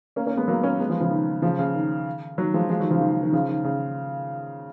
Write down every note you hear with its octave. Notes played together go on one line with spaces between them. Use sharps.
A#3 C#4
A#3 C#4
G#3 B3
F#3 A#3
A#3 C#4
G#3 B3
F3 G#3
C#3 F3
D#3
C#3 F3
C#3
D#3
D#3 F#3
F3 G#3
F3 G#3
D#3 F#3
C#3 F3
D#3
C#3
D#3
C#3 F3
D#3
C#3